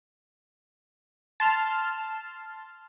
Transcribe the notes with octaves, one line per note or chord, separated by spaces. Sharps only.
A5 C6 F6